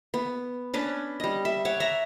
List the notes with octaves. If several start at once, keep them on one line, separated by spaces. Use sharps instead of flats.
B3
C#4 D4 B4
G3 D#5
E5
C#5 F#5 D6
E5 F#5 A#5